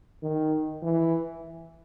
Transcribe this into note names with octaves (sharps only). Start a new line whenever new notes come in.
D#3
E3